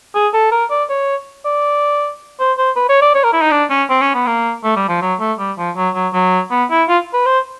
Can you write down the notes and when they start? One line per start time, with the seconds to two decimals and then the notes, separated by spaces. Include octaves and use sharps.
0.15 G#4
0.34 A4
0.52 A#4
0.71 D5
0.89 C#5
1.45 D5
2.40 C5
2.58 C5
2.76 B4
2.89 C#5
3.02 D5
3.15 C#5
3.24 A#4
3.33 E4
3.42 D#4
3.51 D4
3.70 C#4
3.90 C4
4.01 C#4
4.15 B3
4.27 A#3
4.64 A3
4.76 G3
4.89 F3
5.01 F#3
5.20 A3
5.39 G3
5.58 F3
5.76 F#3
5.95 F#3
6.13 F#3
6.51 B3
6.71 E4
6.89 F4
7.14 B4
7.26 C5